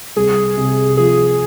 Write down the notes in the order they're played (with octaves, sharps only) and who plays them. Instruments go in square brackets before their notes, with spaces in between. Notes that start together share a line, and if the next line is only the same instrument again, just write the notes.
[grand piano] C2 [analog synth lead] G#4
[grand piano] C3
[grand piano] F3 [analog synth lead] G#4